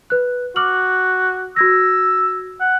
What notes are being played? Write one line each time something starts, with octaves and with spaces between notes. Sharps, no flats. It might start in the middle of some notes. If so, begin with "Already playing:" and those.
B4 F#6
F#4 D6 F6 F#7
F#4 E6 G#6 A#6
F#5